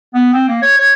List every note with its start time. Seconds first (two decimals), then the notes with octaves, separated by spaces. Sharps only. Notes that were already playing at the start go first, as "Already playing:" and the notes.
0.14 B3
0.33 C4
0.48 A#3
0.62 C#5
0.78 C#5